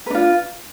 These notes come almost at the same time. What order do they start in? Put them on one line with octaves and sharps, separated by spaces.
B4 D4 F4